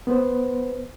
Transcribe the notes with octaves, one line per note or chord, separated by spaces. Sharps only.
B3 B4 C5